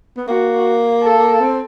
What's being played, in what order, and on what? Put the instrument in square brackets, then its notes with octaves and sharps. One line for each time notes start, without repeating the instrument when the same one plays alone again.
[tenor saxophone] B3
[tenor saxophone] A#3 [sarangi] F#4
[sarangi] A4
[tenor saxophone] C4